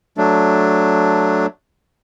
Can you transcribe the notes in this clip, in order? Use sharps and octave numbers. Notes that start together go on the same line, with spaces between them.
F#3 A3 D4